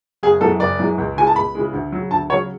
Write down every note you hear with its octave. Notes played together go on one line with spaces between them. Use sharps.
F#1 G#4
F#2 E3 G#3 A4
F#1 D5
F#2 E3 G#3
C#2
C#3 E3 G#3 G#5
A5
C#2 B5
C#3 E3 G#3
D2
C#3 F#3
D2 A5
C#3 F#3 C#5